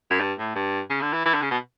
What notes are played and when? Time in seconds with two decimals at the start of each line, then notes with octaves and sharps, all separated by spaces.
0.11 F#2
0.21 G2
0.39 A2
0.56 G2
0.90 C#3
1.02 D3
1.13 E3
1.26 E3
1.34 D3
1.42 C#3
1.51 B2